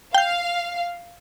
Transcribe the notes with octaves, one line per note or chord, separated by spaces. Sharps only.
F5 G5 G6